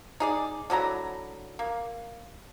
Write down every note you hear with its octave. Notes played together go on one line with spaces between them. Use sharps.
D#4 G#4 D5
D3 F#3 E4 A#5
A#3